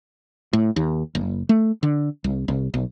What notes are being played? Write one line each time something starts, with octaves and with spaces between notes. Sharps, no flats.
A2
D#2
F#1
A3
D3
C2
C2
B1